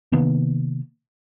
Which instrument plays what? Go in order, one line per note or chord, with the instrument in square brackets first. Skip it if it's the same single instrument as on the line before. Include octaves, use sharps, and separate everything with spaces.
[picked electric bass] C3 D#3 A#3 B3